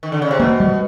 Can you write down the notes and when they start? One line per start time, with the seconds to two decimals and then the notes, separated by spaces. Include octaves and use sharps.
0.03 D#3
0.12 D3
0.22 C#3
0.31 C3
0.40 B2 A#3
0.60 G3